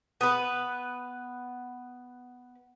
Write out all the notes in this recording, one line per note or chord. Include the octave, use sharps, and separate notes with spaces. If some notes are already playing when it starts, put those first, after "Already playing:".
B3 B4